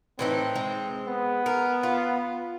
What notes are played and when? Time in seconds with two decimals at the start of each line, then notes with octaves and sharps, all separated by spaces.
0.19 A2 E3 C4 D#4
0.55 G#3
1.07 B3
1.46 A#4
1.83 F4